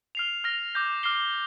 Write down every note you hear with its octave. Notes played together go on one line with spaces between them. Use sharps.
F6 C7 F7
F6 A#6 F7
D6 G6 A#6
D6 F6 C7 G7